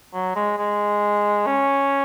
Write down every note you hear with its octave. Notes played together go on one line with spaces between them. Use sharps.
F#3
G#3
G#3
C#4